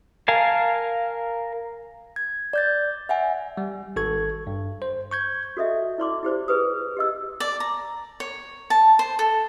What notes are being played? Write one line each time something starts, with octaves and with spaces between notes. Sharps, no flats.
A#4 F5 G#5 A5
G#6
D5 G6 A6
E5 F#5 G#5
G3
G#1 A4 C#6 G#6
G2
C5
C#6 G6 G#6
F#4 A4 D#5 E5
E4 D5 C6 D6
E4 G4 C5 D5
G#4 B4 D#6
G4 D#5 E6
D5
A#5
C#5
A5
C5
A4